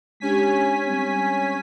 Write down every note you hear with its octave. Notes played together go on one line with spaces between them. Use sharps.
G#3 C#4 D4 G4 G#5 B6
G3 B3 C4